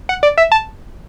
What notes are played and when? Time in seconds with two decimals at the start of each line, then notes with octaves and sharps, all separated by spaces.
0.09 F#5
0.23 D5
0.38 E5
0.52 A5